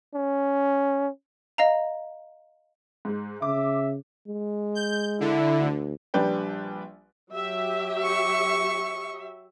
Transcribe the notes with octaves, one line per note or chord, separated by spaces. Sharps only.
C#4
D#5 F5 A#5
G#2 G#3
C#3 E5 D6
G#3
G6
D3 E4
D2
A#1 G3 D4 B4 G5
F#3 G4 E5
C#6